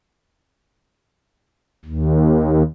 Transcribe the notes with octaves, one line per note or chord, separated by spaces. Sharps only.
D#2